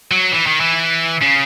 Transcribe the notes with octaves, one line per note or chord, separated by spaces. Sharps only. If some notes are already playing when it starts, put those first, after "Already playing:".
F#3
E3
D#3
E3
C#3